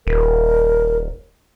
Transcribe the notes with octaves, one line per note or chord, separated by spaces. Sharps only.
D#1 A#4